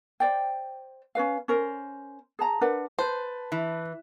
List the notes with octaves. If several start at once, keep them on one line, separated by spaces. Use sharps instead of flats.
C5 D5 G5
C#4 F4 B4 F5
C#4 A#4 C5
G#4 A5 A#5
D4 A#4 B4 F#5
B4 C5 A5
E3